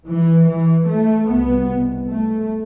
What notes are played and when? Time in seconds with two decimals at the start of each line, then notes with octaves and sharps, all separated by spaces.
0.08 E3
0.49 E3
0.89 A3
1.29 C2 B2 B3
2.10 A3